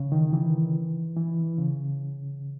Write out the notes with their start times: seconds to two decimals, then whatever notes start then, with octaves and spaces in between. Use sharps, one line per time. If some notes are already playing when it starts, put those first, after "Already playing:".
Already playing: C#3
0.12 D#3
0.33 E3
1.16 E3
1.58 C#3